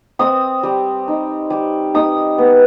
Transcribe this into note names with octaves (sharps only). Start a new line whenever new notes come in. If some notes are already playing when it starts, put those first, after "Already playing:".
C4 D#6
G3
D#4
G3
D#4 D#6
B3